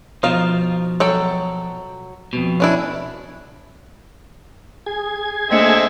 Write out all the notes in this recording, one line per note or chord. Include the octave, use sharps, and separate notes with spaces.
B2 F3 D#4 F5
F#3 A4 G5
F2 B2
C#4 D4 E4
G#4 G#6
D3 A3 A#3 C4 D4 D#5 E5 C#7